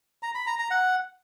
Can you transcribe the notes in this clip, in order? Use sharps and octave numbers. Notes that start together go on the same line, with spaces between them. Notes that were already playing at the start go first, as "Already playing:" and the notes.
A#5
B5
A#5
A#5
F#5